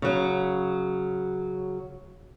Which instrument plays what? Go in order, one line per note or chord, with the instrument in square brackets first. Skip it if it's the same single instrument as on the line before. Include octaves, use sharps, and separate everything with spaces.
[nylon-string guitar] C#3 F#3